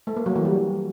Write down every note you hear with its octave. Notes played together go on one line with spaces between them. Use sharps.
A3
A#3
F#3
E3
G3